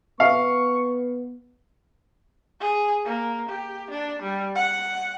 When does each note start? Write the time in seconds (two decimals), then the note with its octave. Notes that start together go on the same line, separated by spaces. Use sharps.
0.20 B3 F5 C#6
2.60 G#4
3.06 A#3
3.49 G4
3.90 D4
4.22 G3
4.55 F#5